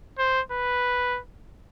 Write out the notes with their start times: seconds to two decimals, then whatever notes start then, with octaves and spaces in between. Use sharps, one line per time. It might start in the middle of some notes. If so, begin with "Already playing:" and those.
0.19 C5
0.52 B4